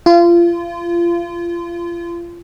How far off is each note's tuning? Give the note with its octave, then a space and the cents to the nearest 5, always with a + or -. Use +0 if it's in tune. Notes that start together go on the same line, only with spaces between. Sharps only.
F4 -30